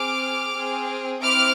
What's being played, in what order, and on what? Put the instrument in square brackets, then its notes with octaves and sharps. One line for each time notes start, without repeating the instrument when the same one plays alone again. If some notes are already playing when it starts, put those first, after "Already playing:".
Already playing: [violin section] C4 G#4 D6 F6
C4 G#4
C4 E4 D6 F6